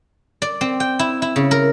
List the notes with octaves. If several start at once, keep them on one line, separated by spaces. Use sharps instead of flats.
D5
C4
G5
E4
E4
C#3
A#4